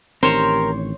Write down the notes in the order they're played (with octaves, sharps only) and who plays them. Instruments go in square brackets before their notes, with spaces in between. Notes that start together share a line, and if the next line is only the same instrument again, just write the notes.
[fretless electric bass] A1 D#3 C4 [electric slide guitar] G4 A#4 [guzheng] C5 C#5